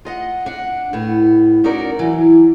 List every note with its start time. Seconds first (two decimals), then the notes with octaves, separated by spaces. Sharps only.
0.05 F4 D#5 F#5
0.46 D4 F#5
0.93 A2 B3
1.64 C#4 D#4 F#4 A#4 D5
1.99 E3 F#3